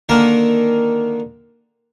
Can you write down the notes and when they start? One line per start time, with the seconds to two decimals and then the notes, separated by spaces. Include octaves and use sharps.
0.09 D3 D#3 A#3 A#4 A5 A#5